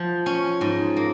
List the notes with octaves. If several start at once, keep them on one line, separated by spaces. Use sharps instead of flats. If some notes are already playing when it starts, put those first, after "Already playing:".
Already playing: F3
C#4
G#2
A#3